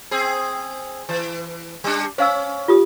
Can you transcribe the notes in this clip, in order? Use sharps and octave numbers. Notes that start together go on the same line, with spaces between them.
C4 G#4
E3
G3 D4
C#4 C5 F5 E6
F4 G4 D#6